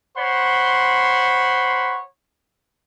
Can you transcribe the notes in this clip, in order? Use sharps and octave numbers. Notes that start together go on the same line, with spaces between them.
C5 C#5 F#5 B5 C6